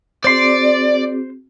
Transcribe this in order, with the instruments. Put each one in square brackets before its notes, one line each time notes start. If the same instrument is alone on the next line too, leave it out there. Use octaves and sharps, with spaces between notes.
[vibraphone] C4 F#4 G#4 [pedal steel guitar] C5 C6 [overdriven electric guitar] D5